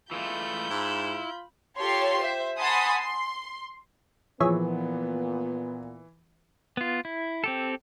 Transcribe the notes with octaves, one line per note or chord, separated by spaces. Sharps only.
E3 G#3 A3 F4 B5 G6
G#2 E4
F4 G4 A4 C#5 C6
C5 E5
F#5 G#5 A5 B5 C6 D#6
C6
A#2 E3 F3 B3 G#4 C#5 E5
B3 F4
E4
C4 G4 A4